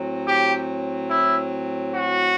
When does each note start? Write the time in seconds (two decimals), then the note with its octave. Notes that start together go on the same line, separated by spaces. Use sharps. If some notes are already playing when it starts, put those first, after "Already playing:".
Already playing: A2 F#3 C4
0.27 G4
1.10 E4
1.93 F#4